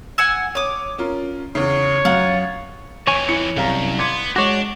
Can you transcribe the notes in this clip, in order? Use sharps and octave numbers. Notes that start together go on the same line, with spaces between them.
F#5 G#5 E6
C#5 D6 D#6
C#4 F4 A#4
E2 C#3 C#5
F#2 F4 F#5
F2 E3 C#5 G#5
E4 C#7
C2 F#2 F5 A#5
B3 C6 D6 G#6
G#3 D4 F#4 C#5 D6